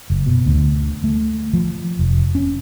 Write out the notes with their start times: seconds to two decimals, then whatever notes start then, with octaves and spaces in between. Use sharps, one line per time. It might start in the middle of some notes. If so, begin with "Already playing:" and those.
0.10 F#1
0.26 B2
0.46 D2
1.04 A3
1.53 F3
1.99 F1
2.35 C#4